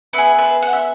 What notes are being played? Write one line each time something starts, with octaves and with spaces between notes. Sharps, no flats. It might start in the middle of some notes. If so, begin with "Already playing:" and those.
B3 G#4 B4 E5
B4 E5
F#5
E5